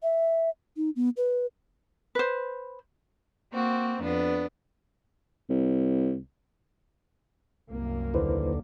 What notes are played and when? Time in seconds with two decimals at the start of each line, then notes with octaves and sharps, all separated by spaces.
0.03 E5
0.77 D#4
0.96 B3
1.17 B4
2.15 B4 C5
3.51 A#3 C4 F#4
4.02 F2 B3 D4
5.50 C2
7.68 C2 F#2 A#3
8.14 D#2 D3 E4 B4 C5